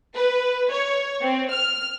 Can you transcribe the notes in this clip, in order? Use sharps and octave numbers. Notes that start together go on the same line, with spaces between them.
B4
C#5
C4
F6